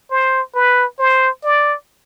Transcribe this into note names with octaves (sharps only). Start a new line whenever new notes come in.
C5
B4
C5
D5